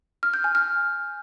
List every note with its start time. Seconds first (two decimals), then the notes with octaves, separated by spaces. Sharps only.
0.23 F6
0.34 G6
0.44 G#5
0.55 F6